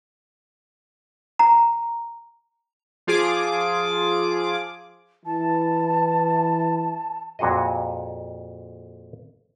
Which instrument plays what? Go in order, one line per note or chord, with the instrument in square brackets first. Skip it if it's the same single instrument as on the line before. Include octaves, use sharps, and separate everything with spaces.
[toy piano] A#5
[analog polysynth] F3 F4 G#4 D6
[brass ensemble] E3 [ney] A5
[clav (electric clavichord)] F2 A#2 F#4 G#4 D#5